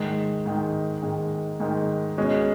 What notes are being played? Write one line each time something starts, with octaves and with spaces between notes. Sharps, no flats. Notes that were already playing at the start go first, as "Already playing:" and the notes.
Already playing: G#2 D#3 G#3
G#2 D#3 G#3
G#2 D#3 G#3
G#2 D#3 G#3
B2 G#3 C#4